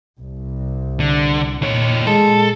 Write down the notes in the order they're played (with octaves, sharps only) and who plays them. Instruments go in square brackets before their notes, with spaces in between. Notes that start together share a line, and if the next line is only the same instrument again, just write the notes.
[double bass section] C2
[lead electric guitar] D3
[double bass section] A#2 [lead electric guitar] D#3 C#5
[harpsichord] G#3 [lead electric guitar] A4